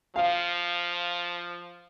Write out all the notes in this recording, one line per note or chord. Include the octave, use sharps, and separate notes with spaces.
F3 F5